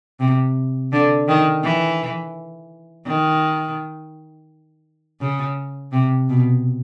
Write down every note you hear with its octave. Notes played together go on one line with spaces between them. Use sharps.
C3
D3
D#3
E3
D#3
C#3
C3
B2